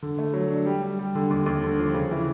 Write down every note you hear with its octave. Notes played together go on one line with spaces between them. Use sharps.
D3
A3
F#3
D4
G3
G3
G3
D3
D#2
D#2
D3
F3
C#3
E3